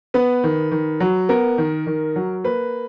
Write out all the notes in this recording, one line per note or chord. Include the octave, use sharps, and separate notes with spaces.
B3 B4
D#3
D#3
F#3
B3 A#4
D#3
D#3
F#3
A#3 B4